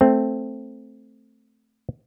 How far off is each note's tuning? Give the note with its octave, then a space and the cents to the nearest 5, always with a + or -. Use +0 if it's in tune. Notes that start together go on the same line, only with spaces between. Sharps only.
A3 +0 C4 +0